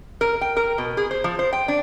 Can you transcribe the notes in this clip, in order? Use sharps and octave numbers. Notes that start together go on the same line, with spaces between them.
A#4
G5
A#4
B2
G#4
C5
F3
C5
G5
D4